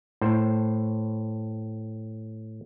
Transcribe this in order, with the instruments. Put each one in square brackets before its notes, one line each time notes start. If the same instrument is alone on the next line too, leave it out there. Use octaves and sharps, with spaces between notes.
[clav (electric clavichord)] A2 C5